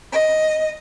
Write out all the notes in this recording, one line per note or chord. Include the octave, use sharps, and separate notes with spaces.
D#5